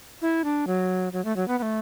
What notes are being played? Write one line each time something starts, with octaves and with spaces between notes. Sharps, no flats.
E4
D4
F#3
F#3
A3
F#3
B3
B3
A3